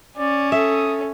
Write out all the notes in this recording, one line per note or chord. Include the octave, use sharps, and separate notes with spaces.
C#4 D5
A4 E5 D#6